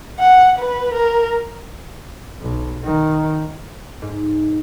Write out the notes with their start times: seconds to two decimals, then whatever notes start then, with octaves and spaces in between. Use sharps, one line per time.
0.19 F#5
0.59 B4
0.94 A#4
2.42 B1
2.84 D#3
4.02 G#2